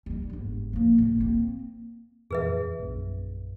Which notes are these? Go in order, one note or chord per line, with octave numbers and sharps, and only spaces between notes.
G3 D#4
G1 G#2
F3 A#3
A2 A#3
A#3 C4
F2 A#2 E3 G#4 B4 E5
A#1 F#2